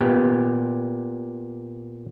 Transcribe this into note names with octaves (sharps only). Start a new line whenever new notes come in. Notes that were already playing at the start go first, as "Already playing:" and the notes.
A#2 B3 G4